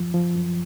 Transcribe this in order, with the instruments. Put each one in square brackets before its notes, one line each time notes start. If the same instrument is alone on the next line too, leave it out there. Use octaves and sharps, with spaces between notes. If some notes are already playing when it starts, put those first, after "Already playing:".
Already playing: [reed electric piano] F#2 F3
F3
F#2